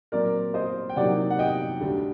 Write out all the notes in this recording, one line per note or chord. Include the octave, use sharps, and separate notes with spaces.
A#2 F#3 C4 A#4 D5
C5 D#5
G5
C3 F#3 A#3 D#4 D5 F#5
F#5
D#5 G5
D2 D3 G3